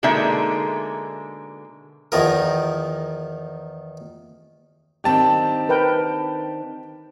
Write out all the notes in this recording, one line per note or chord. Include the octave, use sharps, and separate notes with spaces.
B2 D3 G#3 A#3 D#4 E5
E2 D#3 F3 A#4
D#3 C4 D4 G4 A5
A#4 B4 G5